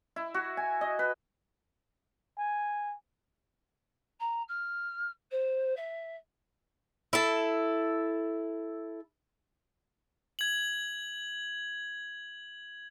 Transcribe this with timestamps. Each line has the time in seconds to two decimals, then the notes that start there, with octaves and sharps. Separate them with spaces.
0.16 E4
0.34 F#4
0.57 G#5
0.81 D#5
0.99 B4
2.38 G#5
4.20 A#5
4.48 F6
5.31 C5
5.76 E5
7.13 E4 A4
10.39 G#6 F#7